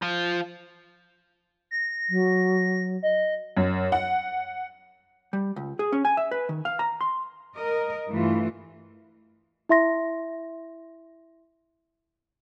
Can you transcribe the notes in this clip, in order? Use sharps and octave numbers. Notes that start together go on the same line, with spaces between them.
F3
A#6
F#3
D#5
F#2
F#5
G3
C#2
G#4
C#4
G#5
E5
B4
D#3
F5
A#5
C6
A#4 D#5
G2 E3 A3 F4
E4 E5 C6 A#6